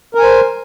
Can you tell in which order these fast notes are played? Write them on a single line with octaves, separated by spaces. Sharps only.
A#4 G#5 C5